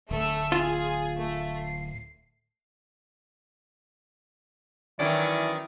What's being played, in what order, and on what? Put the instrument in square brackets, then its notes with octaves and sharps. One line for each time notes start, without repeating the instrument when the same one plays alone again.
[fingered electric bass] D1 [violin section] A3 E5 E6
[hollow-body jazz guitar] F4 [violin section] G#4
[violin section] A3
C7
[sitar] D#3 F#3 [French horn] E3 [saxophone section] C#4 D5 [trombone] E4